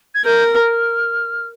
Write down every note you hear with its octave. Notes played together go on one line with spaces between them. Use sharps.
G#6
A#4 G6
F6